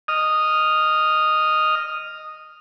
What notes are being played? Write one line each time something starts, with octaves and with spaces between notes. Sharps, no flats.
D#5 D#6 F6